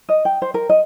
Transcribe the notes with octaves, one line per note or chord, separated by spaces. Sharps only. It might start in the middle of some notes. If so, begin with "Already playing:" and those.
D#5
G5
C5
A#4
D#5